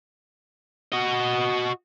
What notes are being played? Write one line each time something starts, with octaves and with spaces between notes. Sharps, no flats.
F#4 D#5